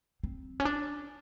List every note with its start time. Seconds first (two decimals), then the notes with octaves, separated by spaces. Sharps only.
0.24 C4
0.60 C#4
0.65 D4